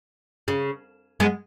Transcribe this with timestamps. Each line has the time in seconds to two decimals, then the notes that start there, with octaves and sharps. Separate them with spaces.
0.48 C#3
1.20 G#3 B3